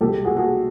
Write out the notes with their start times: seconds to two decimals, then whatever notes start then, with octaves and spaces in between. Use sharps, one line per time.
0.01 C2 B2 G#3 G4 A4
0.25 F#4 G#4
0.37 F#4 G#4